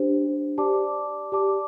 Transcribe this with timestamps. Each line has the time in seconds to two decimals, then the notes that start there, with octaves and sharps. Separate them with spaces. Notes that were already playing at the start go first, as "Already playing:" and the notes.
Already playing: D4 G4 C5
0.58 G4 D5 A5 D6
1.32 G4 D5 A5 D6